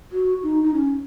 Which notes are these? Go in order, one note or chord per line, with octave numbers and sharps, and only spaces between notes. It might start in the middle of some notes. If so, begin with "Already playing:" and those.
F#4
D#4
D#4
C#4